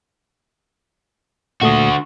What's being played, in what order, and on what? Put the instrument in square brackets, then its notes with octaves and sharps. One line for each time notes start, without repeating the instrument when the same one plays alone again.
[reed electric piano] A#2 A3 D#6 [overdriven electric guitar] D3 F#4